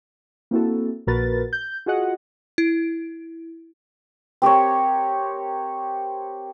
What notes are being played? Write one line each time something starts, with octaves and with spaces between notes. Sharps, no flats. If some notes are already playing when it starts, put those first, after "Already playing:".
A#3 C4 E4 F#4 A4
A#1 A#2 F#4 A#4 B4 A6
G6
F4 F#4 G#4 D#5 F#5
E4
C4 G4 A#4 C#5